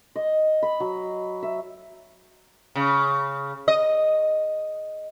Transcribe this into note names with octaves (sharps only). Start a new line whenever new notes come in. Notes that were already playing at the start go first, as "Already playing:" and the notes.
D#5
B5
F#3
E5
C#3
D#5